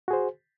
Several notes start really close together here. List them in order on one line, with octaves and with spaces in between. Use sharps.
F#4 G#4 C5